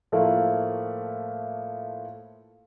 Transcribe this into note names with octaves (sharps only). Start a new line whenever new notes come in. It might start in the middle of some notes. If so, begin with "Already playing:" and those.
A2 F3 A3 A#3 E4